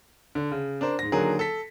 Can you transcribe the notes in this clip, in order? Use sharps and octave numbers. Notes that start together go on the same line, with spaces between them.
D3
C#3
D4 A#4 C5
G#2 A#6
D3 D#3 F#3 A#3 G#4 A#4
A4 B6